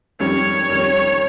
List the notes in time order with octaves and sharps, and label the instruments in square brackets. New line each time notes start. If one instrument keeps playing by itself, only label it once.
[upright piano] F2 D#3 G3 C#4 [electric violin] C#5
[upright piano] F2 D#3 G3 C#4